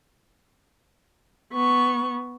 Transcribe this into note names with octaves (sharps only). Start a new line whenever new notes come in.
B3 C#6